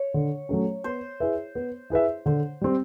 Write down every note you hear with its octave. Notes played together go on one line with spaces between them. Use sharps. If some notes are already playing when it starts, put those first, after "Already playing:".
Already playing: C#5
D3
F#3 A3 C#4
B3 C5
E4 G#4 B4 E5
B3
E4 G#4 B4 E5
D3 C5
G3 C4